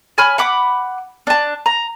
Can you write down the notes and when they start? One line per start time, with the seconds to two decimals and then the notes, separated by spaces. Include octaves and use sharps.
0.18 C#5 G#5 B5 F6
0.38 F#5 B5 D6
1.27 D4 A5
1.66 A#5